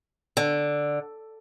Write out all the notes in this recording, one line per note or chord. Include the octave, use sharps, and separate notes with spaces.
D3